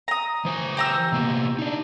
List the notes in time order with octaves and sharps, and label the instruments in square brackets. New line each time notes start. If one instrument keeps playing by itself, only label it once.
[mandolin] A#5 D#6
[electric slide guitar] E3 C5 G#5
[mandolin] G4 A#5 E6
[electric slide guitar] C3 A#3 B3
D4 D#4